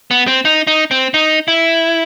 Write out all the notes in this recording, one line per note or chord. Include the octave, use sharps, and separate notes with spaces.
B3
C4
D#4
D#4
C4
D#4
E4